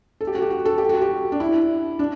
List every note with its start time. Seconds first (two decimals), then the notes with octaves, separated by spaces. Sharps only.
0.21 A4
0.27 G4
0.35 F#4
0.42 G4
0.50 F#4
0.65 A4
0.78 G4
0.89 F#4
1.01 G4
1.32 D4
1.40 E4
1.99 D4